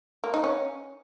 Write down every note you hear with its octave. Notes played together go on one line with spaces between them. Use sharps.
A#3
D#4
C#4